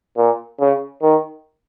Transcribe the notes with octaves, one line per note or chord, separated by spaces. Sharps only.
A#2
C#3
D#3